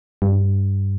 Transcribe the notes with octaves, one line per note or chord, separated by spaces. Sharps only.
G2